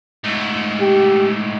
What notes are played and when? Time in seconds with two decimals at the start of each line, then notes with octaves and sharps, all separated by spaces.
0.24 G#2 A3
0.80 G4